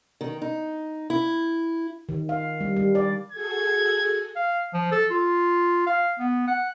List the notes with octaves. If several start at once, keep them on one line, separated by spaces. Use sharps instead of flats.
D#3
D#4
E4
D#3
F5
G3
G3
D5
F#4 G#4 A4 G#6
F5
F3
A4
F4
F5
B3
F#5